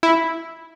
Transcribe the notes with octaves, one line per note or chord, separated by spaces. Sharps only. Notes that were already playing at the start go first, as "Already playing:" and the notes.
E4